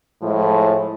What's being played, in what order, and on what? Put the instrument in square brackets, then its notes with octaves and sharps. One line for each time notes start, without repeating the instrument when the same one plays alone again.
[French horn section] A2 F3 G#3